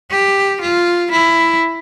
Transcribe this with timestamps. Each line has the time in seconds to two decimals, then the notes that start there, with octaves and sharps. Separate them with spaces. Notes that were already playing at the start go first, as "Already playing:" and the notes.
0.11 G4
0.61 F4
1.11 E4